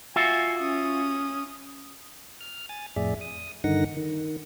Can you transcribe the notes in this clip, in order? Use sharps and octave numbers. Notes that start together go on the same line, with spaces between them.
F4 F#4 E5 G#5
C#4 D#6
F6
G#5 A6
F2 A2 G#4 D5 E5
D#6
G2 D3 D#3 D#4 F#5 A#6
D#3